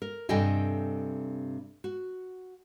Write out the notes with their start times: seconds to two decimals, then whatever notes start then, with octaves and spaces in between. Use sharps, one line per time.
0.02 A#4
0.29 G2 C3 A4 D#5 G5 G#5
1.84 F#4